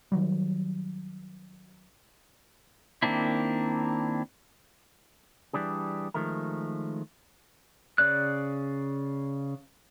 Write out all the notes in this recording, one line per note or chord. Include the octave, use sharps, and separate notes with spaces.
D#3 F#3 G3
D#3 A#3 C4 D4 E4
E3 G3 D4 G#4
D#3 F3 G#3 A3 A#4
C#3 D5 F#6